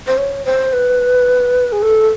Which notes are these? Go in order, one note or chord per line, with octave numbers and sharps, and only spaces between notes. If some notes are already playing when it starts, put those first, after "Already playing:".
C5
C#5
C5
B4
G#4
A4